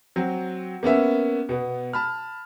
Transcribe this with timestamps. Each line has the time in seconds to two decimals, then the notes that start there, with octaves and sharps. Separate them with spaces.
0.16 F#3 C4
0.83 A#3 B3 C#4 E5
1.49 B2 B3
1.93 A5 B5 F6